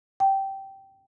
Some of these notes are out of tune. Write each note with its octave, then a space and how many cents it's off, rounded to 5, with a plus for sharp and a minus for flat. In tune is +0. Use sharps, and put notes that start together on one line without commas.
G5 -15